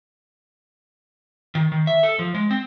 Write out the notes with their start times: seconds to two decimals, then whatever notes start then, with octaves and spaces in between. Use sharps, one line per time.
1.55 D#3
1.72 D#3
1.87 E5
2.03 A4
2.19 F3
2.35 G#3
2.51 C4